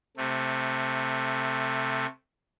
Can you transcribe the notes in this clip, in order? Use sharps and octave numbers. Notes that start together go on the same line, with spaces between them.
C3 A3